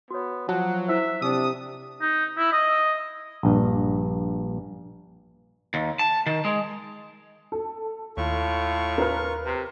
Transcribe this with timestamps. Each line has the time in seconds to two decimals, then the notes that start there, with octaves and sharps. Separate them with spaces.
0.10 B3 F#4 B4 C#5
0.49 F3 F#3 F#5 A5
0.88 E4 C5 E5
1.22 C3 D4 D#6
2.01 D#4
2.38 E4
2.52 D#5
3.43 A#1 G2
5.74 D#2
5.99 A5
6.26 D#3
6.45 G#3
7.52 A4
8.17 D#2 A2 F4 C#6
8.98 A#4 B4 F6
9.45 C3